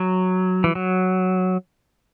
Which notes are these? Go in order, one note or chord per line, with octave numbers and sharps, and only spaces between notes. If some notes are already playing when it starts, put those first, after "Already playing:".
Already playing: F#3
E3
F#3